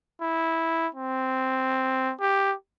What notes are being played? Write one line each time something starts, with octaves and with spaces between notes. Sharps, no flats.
E4
C4
G4